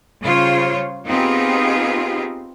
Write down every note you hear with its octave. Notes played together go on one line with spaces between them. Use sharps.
C#3 G3 F4 C5 C#5
B3 C4 D#4 F4 G4 G#4